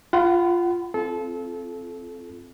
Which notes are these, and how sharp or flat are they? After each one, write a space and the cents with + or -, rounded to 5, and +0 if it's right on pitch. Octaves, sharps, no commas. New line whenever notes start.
F4 -5 F#5 +25 B5 +25
C4 +0 F4 -20 A4 -30